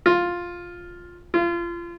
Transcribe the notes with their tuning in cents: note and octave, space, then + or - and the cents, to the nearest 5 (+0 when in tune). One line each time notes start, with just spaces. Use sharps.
F4 +5
F4 -30